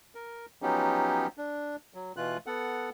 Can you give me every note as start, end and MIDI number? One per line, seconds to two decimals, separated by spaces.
0.15 0.46 70
0.62 1.27 53
0.62 1.27 54
0.62 1.27 59
0.62 1.27 61
0.62 1.27 63
0.62 1.27 67
1.38 1.76 62
1.94 2.12 54
2.17 2.38 47
2.17 2.38 52
2.17 2.38 65
2.17 2.38 90
2.46 2.90 59
2.46 2.90 69
2.46 2.90 78